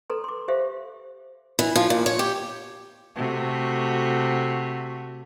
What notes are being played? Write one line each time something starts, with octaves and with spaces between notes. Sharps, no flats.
A4 B4 A#5 C6
C6 D6
G4 C5 E5 F5
E3
F3
A#2
C#5
G4
C3 A3 F#4